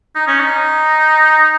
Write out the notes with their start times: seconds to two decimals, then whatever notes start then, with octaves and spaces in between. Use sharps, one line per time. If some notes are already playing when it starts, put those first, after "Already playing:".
0.16 D#4
0.27 C#4
0.41 D#4